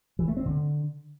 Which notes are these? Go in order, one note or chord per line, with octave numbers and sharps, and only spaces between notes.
E3
A3
C4
D3